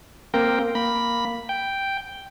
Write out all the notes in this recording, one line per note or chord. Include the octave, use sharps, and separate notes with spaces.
A#3 C4 A#4 G5
A#3 B5
G5